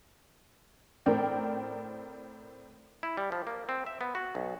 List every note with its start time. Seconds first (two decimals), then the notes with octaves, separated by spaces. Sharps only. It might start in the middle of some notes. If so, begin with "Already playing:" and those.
1.06 A2 C4 A#4 D5 G5
3.03 E4
3.17 G3
3.32 F3
3.47 A#3
3.69 C4
3.86 E5
4.01 B3
4.15 F#4
4.35 B1